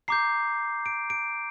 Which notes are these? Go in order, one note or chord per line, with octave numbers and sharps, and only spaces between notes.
A#5 D6 G6 C7
D7
D7